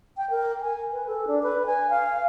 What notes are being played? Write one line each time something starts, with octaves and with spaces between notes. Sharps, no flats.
G5
A#4
G#5
B4
A4
D4
B4
G#5
F5